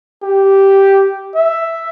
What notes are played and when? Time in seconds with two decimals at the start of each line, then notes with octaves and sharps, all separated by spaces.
0.23 G4
1.35 E5